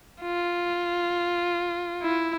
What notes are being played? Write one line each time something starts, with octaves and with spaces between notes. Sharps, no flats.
F4
E4